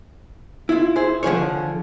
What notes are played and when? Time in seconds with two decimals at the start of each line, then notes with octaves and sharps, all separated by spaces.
0.69 E4 F4
0.96 E4 G#4 C5
1.23 D3 F3 G#4 C#5